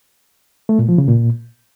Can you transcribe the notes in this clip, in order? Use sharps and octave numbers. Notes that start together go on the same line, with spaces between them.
A3
A#2
F3
C#3
A#2